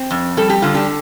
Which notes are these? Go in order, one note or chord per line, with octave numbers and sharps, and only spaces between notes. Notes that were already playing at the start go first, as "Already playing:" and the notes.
Already playing: C4
F2
G3 A4
G4
D3 F4
D4 G4